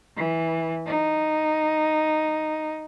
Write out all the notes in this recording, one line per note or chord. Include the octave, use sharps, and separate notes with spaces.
E3
D#4